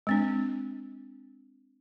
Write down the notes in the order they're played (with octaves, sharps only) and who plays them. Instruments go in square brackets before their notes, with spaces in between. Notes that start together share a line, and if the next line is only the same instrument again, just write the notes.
[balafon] G#3 C4 D4